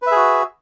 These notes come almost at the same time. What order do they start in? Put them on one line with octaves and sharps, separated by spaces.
B4 E5 G#4 F#4